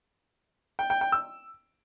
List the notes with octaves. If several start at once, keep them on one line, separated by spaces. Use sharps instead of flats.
G5
G5
G5
E6